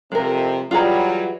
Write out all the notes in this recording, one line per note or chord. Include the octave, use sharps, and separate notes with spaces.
F2 C3 G#3 A#4
E3 F#3 G3 F4 G#4 A#5